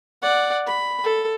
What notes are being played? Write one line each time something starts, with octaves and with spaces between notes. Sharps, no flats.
D5 F#5
B5
A4